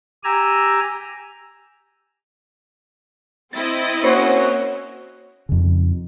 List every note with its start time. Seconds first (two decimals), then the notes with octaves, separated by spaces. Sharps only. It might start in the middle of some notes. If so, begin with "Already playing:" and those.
0.24 G4 G#5 A#5 E6
3.53 C4 E4 D#5 A6
4.04 A#3 C#4 F#4 C5 C#5
5.49 F2 C#3